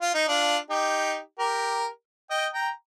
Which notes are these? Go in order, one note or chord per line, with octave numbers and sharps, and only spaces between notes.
F4
D#4
D4 F4
D#4 G4
G4 A#4
D#5 G5
G5 A#5